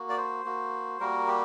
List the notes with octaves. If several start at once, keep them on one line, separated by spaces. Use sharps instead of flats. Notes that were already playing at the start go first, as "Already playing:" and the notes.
Already playing: A#3 F#4
D5
C5
A#3 F#4
G3 A#3 F#4 A#4
G4